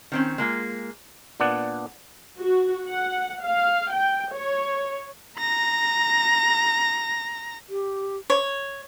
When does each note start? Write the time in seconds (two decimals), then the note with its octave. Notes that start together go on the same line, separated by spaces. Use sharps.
0.12 D#3 C4 C#4
0.38 G#3 A#3 F4
1.40 A#2 B3 D4 D5 F#5
2.38 F#4
2.85 F#5
3.43 F5
3.91 G5
4.33 C#5
5.39 A#5 A#6
7.69 G4
8.30 C#5